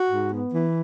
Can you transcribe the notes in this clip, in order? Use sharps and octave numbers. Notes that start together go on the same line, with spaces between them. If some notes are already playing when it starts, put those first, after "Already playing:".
Already playing: F#4
G#2
B3
E3